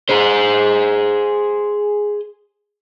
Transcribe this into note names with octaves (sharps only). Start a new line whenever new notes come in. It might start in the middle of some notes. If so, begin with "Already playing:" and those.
G#4 C5